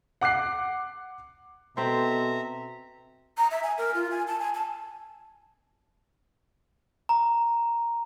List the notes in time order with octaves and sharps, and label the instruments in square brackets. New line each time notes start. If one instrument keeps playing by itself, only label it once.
[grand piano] F#5 D6 F#6 C7
[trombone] B2 [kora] C4 C5 [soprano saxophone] A4 [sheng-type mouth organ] E5 A#5
[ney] A#5
E5
G#5
A#4
F4
G#5
A5
G#5
A5
[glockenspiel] A#5